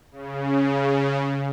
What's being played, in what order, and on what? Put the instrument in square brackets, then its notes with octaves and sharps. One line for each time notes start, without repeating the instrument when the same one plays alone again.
[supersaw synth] C#3